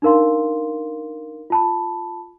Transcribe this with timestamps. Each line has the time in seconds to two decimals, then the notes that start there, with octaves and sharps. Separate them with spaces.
0.02 D4 D#4 A#4 F5 C6
1.50 F4 A5 B5